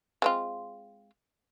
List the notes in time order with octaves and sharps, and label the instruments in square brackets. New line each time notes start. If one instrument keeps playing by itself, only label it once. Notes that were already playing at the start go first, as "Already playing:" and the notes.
[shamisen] G#3 C4 F4